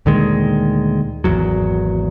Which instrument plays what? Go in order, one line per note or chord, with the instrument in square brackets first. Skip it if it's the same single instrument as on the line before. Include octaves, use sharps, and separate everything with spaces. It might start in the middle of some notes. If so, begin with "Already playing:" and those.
[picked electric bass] D2 A#2 D#3 G#3
G#1 E2 F#3